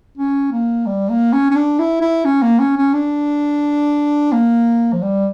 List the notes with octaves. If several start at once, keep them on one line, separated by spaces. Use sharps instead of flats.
C#4
A#3
G3
A#3
C#4
C#4
D4
E4
E4
C#4
A#3
C#4
C#4
D4
A#3
F3
G3